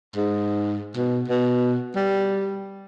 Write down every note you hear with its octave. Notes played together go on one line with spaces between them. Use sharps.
G#2
B2
B2
G3